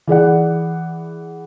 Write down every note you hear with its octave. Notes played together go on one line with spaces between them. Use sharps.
E3 G#4 D5 F#5